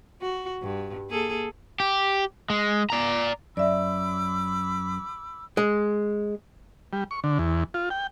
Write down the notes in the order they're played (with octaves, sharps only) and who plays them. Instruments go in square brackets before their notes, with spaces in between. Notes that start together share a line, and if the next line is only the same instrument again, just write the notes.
[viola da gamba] F#4
G2
A#3 G#4 A4
[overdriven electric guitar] G4
G#3
D5 A#5
[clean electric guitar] F#2 [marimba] D5 E5 [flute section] B5 D6 E6
[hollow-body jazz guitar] G#3
[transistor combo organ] G3
C#6
D3
E2
F4
G5